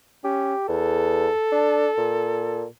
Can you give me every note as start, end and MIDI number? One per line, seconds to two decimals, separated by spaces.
0.24 0.55 61
0.24 0.67 67
0.69 1.28 40
0.69 2.65 69
1.52 1.87 62
1.98 2.66 46